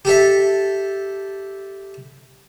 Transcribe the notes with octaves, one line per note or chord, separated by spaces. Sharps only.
G4 A4 E5